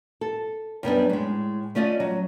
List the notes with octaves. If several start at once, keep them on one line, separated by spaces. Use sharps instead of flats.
A4
F#2 G3 B3 D4
A2 G#3
A3 C#4 F4 D5 D#5
F#3